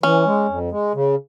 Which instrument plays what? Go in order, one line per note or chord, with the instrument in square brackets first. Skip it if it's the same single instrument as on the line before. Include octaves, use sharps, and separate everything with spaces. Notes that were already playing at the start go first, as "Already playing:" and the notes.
[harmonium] E3 [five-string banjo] C#4
[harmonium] G#3
F2
G#3
C#3